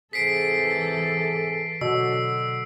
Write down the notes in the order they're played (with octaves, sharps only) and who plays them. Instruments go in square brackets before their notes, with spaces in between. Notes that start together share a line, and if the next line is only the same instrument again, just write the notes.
[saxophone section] G#2 C3 G#4 [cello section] E3 A4 [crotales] B6 C7 D7
[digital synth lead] B2 [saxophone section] D3 F#3 [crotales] E6